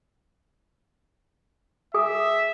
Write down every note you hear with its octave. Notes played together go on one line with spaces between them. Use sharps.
G#4 E5 G#5 D#6